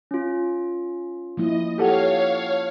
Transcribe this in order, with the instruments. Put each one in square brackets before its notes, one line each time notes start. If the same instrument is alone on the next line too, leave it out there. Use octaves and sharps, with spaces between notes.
[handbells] C#4 F4
[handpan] F3 A#3 E4 [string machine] D#5
[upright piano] G4 A4 F#5 [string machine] C#5 F5